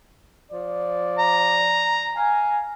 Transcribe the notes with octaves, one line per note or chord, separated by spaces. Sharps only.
F3 D5
A#5
F5 G#5